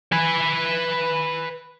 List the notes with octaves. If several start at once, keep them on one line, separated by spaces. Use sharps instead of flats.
B4 G#5